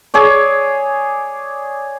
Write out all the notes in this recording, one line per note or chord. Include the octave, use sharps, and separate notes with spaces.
G#4 C#5 D5